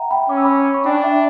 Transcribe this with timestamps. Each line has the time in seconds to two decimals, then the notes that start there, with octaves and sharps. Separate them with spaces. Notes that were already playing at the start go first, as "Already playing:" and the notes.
Already playing: E5 F#5 G5 A#5
0.11 G5 B5
0.29 C#4 D6
0.37 E6
0.45 B5 D6
0.74 C#6
0.85 D4 G5 B5
1.04 E5 G5